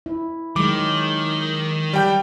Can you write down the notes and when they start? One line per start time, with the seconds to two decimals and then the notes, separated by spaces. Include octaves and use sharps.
0.06 E4
0.56 D#3 F#3 G#3 D6
1.93 G3 G5 G6